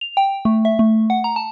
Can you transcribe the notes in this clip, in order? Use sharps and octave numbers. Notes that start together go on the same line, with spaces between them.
F7
G5
A3
E5
A3
F#5
A#5
A5